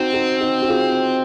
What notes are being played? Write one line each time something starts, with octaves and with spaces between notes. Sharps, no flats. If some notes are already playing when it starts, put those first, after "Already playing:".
Already playing: C4 D#4 F#4
D#4 F#4
D#4 F#4
F#4
F4 G#4